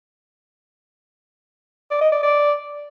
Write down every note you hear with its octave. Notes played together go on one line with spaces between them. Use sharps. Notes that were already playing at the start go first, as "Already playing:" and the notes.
D5
D#5
D5
D5